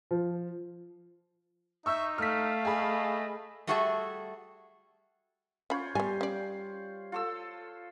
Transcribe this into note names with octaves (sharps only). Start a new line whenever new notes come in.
F3
D#4 E5 C#6 E6 G6
A3 F5 F6 B6
G#4 D#5 B5
G3 A3 F#4 G#4 A4 E5
C#4 F4 C5 C#5 B5
G3 B3 G#5
C#4 D5
F4 A4 E6